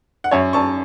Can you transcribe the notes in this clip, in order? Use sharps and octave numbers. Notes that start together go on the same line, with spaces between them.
F#5
F#2 C#5 E5
F#2 A5 C#6